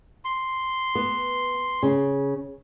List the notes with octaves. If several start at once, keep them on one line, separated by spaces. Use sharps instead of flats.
C6
B3
C#3